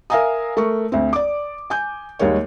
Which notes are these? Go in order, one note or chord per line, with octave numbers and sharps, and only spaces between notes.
A#4 E5 F5 G#5 A#5 D#6
A3 A#4 C#6
D2 C4
D5 D6
G#5 G6
D#2 G3 G#3 A#3 C#5